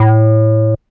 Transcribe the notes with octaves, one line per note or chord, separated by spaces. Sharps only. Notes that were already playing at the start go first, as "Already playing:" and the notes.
Already playing: A2